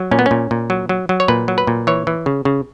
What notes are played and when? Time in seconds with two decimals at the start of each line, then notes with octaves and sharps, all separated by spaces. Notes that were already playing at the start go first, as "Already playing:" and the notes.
Already playing: F#3
0.11 A#2 C#4
0.19 B3
0.26 C#4
0.31 A#2
0.51 A#2
0.70 F#3
0.89 F#3
1.09 F#3
1.20 C#5
1.28 A#2 B4
1.48 F#3
1.58 B4
1.67 A#2
1.87 E3 C#5
2.07 E3
2.26 C#3
2.45 C#3